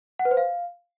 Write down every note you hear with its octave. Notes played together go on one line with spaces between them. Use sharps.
F#5
B4
C5
F5